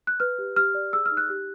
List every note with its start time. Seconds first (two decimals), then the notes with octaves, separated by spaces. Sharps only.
0.07 F#6
0.20 B4 F6
0.38 G4
0.56 G4 F6
0.74 D5
0.93 G#4 E6
1.06 F6
1.11 D#4
1.17 F#6
1.29 G4